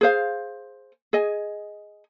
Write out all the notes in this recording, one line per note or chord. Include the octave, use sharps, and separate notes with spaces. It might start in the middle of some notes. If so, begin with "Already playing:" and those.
G#4 C5 F5
G#4 D#5 G#5